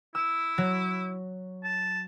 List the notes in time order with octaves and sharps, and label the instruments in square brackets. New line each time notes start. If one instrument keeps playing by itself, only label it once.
[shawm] E4 [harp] E6
[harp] F#3
[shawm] A5